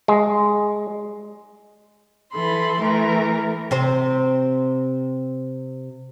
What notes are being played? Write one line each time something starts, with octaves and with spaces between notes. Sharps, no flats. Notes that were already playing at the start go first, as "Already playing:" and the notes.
G#3
E3 A4 B5 C6
E3 A3 A#4
C3 C4 C5